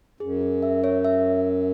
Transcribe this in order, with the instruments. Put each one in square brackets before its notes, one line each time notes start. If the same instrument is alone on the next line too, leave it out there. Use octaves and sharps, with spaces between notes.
[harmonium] F#2 [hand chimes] G#4
[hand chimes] G#4
E5
C#5
E5